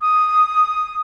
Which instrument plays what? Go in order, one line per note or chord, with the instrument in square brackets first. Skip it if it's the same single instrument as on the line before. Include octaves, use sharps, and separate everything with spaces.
[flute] D#6